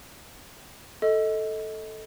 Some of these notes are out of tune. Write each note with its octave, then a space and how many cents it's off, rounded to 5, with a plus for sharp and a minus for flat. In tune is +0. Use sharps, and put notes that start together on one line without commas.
A4 -5 D#5 +20